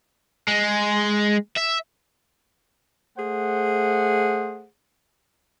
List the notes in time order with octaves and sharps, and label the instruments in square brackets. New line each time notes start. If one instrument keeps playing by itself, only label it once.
[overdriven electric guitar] G#3
E5
[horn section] A3 G#4 C5 F#5